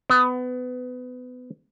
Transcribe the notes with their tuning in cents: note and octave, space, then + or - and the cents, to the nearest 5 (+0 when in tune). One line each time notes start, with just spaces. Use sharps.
B3 +25